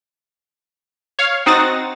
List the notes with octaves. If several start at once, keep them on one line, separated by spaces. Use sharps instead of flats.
C#5 F5 F6
C4 D#4 F#4 D#6 A6 A#6